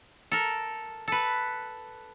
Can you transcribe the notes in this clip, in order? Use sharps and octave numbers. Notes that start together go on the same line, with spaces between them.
A4 A#4
A4 B4